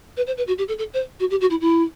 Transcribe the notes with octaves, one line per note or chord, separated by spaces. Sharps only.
B4
C5
B4
F#4
G4
A4
A4
C5
F#4
G4
F#4
E4
E4